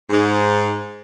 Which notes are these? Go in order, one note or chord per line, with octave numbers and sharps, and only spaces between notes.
G#2